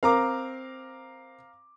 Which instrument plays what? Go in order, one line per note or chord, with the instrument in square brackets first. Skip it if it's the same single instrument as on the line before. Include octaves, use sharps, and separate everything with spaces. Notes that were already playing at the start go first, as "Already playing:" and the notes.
[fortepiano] C4 A#4 [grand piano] F5 A#5 D6